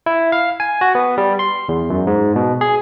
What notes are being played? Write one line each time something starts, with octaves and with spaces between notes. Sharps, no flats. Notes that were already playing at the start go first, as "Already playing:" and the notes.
E4
F5
G#5
F#4
B3
G3
C6
E2
F#2
G#2
B2
G#4